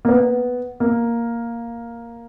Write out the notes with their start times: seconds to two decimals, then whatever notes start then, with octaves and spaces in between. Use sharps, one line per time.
0.05 A#3
0.09 B3
0.80 A#3